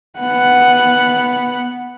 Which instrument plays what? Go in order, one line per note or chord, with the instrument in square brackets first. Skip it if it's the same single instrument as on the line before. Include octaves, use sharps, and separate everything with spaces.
[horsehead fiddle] B3 F#5